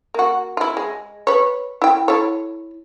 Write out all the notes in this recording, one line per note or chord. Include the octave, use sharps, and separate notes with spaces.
A#3 F#4
E4 F4
G#3
B4 C#5
E4 G5
E4 A4 C#5